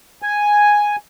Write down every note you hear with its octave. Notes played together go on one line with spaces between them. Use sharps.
G#5